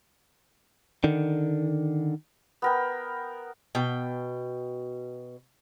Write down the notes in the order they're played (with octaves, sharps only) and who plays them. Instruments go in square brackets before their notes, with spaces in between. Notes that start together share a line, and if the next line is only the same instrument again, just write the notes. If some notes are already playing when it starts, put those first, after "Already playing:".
[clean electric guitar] D3 D#3
[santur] B3 A#4 G5
[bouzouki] B2 G5